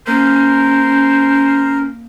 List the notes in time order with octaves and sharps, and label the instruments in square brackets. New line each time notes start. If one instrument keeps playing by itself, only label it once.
[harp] A#3 [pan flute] C#4 [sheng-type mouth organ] A#4 [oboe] C5